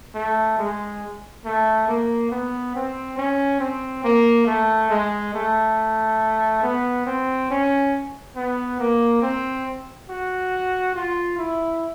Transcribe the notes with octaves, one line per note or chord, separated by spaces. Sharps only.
A3
G#3
A3
A#3
B3
C4
C#4
C4
A#3
A3
G#3
A3
B3
C4
C#4
B3
A#3
C4
F#4
F4
E4